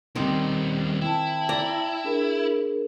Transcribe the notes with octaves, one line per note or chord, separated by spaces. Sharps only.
D#2 D#3 G3 C4 D#4
E4 G5 A5
D5 A#5
D4 G#4 A#4